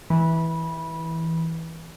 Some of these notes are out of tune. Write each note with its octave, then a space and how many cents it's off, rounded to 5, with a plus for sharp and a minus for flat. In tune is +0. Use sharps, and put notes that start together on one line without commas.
E3 -10 B5 -20